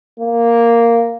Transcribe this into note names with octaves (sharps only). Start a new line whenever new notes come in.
A#3